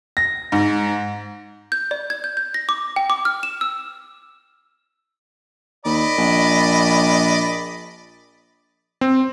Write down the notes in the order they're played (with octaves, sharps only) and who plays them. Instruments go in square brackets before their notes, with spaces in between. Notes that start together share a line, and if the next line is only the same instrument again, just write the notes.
[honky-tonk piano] A#6
G#2
[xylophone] G6
D5
G#6
G6
G6
A#6
D6
G5
D6
F6
E7
E6
[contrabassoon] D#2 [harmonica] D5 D#5 B5
[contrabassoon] A#1
[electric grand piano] C4